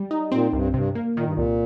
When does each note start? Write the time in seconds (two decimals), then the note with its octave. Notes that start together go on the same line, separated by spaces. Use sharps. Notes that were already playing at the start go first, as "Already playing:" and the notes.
Already playing: G3
0.11 D#4
0.32 A#2 C4
0.53 C2 G2
0.74 G2 C3
0.95 A#3
1.16 A#2 D#3
1.25 G2
1.33 C2 A#2